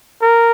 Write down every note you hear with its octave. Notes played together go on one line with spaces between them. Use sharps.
A#4